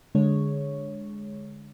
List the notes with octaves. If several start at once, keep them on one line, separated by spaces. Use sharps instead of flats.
D3 G#3 C#5